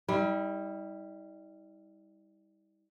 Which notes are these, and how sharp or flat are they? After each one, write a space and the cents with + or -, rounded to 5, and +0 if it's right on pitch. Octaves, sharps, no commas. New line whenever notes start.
G3 +10 E4 -45